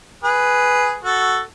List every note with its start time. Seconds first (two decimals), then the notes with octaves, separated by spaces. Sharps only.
0.24 G#4 B4
1.04 F#4 A4